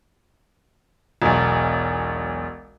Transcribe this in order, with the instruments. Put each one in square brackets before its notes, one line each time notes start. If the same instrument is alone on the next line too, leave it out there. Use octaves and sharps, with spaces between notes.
[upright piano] E1 B1